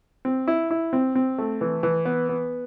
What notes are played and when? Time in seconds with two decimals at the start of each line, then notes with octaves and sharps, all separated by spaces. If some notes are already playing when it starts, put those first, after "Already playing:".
0.25 C4
0.48 E4
0.71 E4
0.93 C4
1.15 C4
1.38 A3
1.61 E3
1.83 E3
2.05 B3
2.29 B3